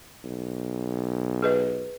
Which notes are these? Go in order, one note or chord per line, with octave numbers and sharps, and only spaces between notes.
B1
G#4 B4 D#5